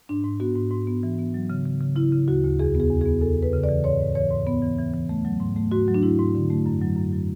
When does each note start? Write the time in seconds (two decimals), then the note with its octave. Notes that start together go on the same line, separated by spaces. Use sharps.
0.09 G#2 D4
0.24 G#2
0.40 B3 F#4
0.56 G#2
0.71 G#2
0.87 B3
1.03 E3
1.19 B3
1.34 F#3
1.50 C#3
1.65 C#3
1.80 C#3
1.96 C#3 E4
2.12 C#3
2.28 D2 F#4
2.44 D2
2.59 E2 G#4
2.75 B3 G#4
2.91 E2
3.01 B3 G#4
3.21 E2 A4
3.38 E2 B4
3.53 C#3
3.63 D5
3.69 E3
3.84 G#2 C#5
4.00 G#2
4.15 E3 C#5
4.31 G#2
4.47 B3
4.62 E3
4.78 E3
4.93 E3
5.09 A3
5.25 F#3
5.40 G#2
5.56 A3
5.72 G#2 F#4
5.88 F#3
5.94 D4
6.03 G#2 E4
6.19 G#2
6.35 D3
6.50 A3
6.66 F#2
6.82 F#3
6.97 F#2
7.13 F#3